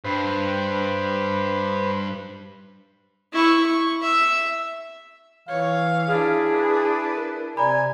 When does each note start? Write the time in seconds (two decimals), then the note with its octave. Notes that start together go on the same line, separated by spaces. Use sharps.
0.04 G2 B4 C5
3.33 E4 C#6
3.66 C#6
4.02 E5
5.48 E3 C#5 F5
6.08 D4 E4 G#4
6.53 B4
7.17 A#4
7.57 C3 D5 G#5 A#5 B5